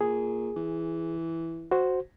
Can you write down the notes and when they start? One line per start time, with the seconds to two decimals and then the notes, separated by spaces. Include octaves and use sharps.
0.01 A#2 G#4
0.57 E3
1.71 F#4 C5